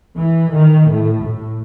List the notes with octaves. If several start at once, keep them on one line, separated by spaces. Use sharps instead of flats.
E3
D#3
A2
A2